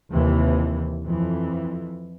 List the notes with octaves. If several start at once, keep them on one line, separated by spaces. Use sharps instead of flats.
D#2 C3 E3
F2 E3